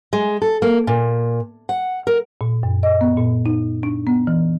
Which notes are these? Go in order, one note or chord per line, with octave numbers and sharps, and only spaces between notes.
G#3
A4
A#3
A#2
F#5
A#4
A#2
F#2
D#5
B3
A#2
D#4
D4
B3
E3